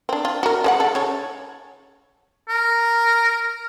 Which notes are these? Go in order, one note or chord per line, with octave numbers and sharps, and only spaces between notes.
C4 D4
F4
F#4 A#4
G#3 D5 F#5
A4
C#3 C#5
A#4